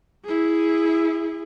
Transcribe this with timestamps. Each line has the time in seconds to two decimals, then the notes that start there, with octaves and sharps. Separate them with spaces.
0.25 E4 G#4